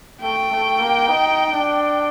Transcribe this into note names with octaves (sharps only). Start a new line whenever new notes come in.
A3 G5
A3
A#3
D#4
D4